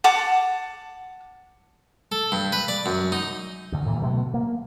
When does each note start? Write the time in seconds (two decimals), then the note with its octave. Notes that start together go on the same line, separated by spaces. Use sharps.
0.04 F#5 A5 D6
2.12 A4
2.32 G2
2.52 B4
2.68 D5
2.86 F#2
3.12 D#4
3.72 D2 D3
3.86 A2 D#3 E3 A#3
4.01 B2 F#3 A3 B3
4.34 A#3